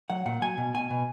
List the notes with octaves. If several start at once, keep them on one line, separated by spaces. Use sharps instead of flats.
F#3 F#5
A#2 F#5
F#3 G#5
B2
B2 G#5
B2